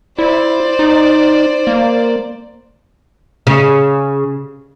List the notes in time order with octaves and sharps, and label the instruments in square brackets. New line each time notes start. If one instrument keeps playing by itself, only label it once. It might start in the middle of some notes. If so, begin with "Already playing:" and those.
[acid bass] E4 [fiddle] C5 D5
[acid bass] D#4
A#3
[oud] C#3